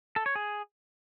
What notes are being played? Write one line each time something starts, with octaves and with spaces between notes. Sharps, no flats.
A4
C#5
G#4